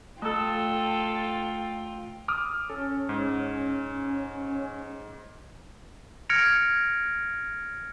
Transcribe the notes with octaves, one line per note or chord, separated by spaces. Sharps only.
A3 F4 A4 G5 E6
D6 D#6 F6
C#4 A4
G#2
F6 G#6 A#6 C#7 D7 F7